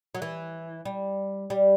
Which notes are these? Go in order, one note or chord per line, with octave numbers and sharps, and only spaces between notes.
F#3
E3
G3
G3